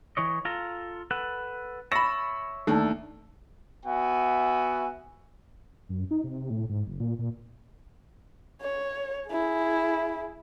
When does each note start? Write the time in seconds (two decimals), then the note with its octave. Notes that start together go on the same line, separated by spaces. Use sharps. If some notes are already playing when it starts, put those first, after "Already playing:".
0.17 E3 C#5 D#5
0.45 F4 A4 A#5
1.11 A4 B4 F#5
1.92 C#5 E5 A5 B5 A#6
2.67 D#2 A3 D4 A4
3.85 B3 F#4 E5 G#5
5.89 F#2
6.11 D#4
6.24 C3
6.50 A2
6.69 G#2
6.87 F#1
7.00 A#2
7.19 A#2
8.62 C#5
9.29 E4 G#4